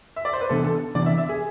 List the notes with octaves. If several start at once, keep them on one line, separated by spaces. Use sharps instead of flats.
E5
D5
C5
B4
C3 E3 B3 D4 A4
A4
C3 E3 B3 D4 D5
E5
E5
G#4